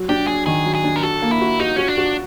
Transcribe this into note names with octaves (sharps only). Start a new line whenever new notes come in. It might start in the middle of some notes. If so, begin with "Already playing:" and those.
Already playing: F#3
D4 G4
F#3 G#4
D#3 G#4
F#3
G#4
D4
A#4
F#4 A4
A#3
E4
F#4
D#4 F#4
C#4 F#4
D4
F#4